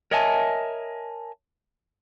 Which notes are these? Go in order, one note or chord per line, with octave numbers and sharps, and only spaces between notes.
A#4 C#5 D#5 E5 G#5 A5